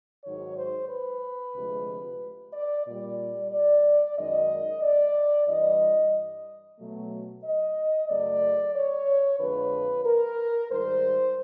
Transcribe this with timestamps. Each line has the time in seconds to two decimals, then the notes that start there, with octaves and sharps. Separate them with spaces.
0.24 G#2 D#3 F#3 C#5
0.57 C5
0.89 B4
1.55 D2 C3 F3 G#3
2.53 D5
2.86 A#2 G3 D5
3.51 D5
4.17 F#2 D#3 G#3 D#5
4.82 D5
5.48 G2 E3 G3 D#5
6.79 B2 F#3 A3
7.44 D#5
8.09 F#2 C#3 F#3 A3 D5
8.75 C#5
9.40 F2 D3 F3 G#3 B4
10.05 A#4
10.71 G#2 D#3 G3 C5